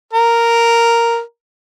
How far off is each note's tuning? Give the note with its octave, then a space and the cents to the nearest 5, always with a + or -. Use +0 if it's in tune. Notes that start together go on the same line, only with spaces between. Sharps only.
A#4 -5